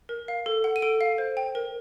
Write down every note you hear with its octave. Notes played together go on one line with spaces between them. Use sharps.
A#4
F5
A4
F#5
D#7
A4 D7
F5
C5
G5
A#4